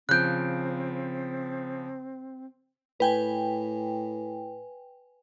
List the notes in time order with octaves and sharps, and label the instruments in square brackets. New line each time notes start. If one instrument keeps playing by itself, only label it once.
[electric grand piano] C#3 F3 D7 [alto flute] C4 [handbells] F#6 G6
[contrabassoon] A2 [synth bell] B4 G5 G#5